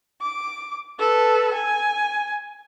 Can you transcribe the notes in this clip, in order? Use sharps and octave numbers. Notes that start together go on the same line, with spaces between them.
D6
A4 B4
G#5